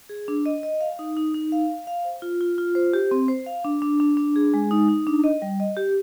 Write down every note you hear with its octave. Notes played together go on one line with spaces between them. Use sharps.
G#4
D4
D#5
D#5
F5
D#4
D#4
D#4
F5
F5
F5
C5
F4
F4
F4
C5
G4
C4
C5
F5
D4
D4
D4
D4
G#4
G#3
D#4
D#4
D4
D#5
G3
D#5
G4